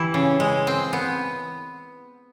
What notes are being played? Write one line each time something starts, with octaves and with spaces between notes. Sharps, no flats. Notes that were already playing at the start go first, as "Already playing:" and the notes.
Already playing: E3 E4 G4
C#3
G#3
C4
B3